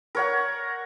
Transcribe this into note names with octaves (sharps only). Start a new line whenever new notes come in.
A#4 C#5 F#5